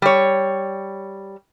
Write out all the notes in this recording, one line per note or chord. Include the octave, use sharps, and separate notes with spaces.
G3 C#5